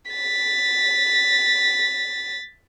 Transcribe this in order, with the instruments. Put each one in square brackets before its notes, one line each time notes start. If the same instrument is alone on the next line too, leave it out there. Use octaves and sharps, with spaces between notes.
[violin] A6 B6